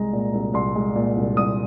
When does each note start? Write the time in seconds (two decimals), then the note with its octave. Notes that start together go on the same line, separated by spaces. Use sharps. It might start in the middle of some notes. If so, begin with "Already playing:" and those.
Already playing: C2 G#3 A#5
0.13 A#2
0.34 C2
0.54 C2 C6
0.75 G#3
0.96 A#2
1.16 C2
1.37 C2 D#6